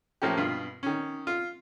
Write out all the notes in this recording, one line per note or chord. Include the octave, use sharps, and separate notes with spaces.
A2 F3 A#3 C#4 G4
G2 B2 F4
D#3 C#4
F4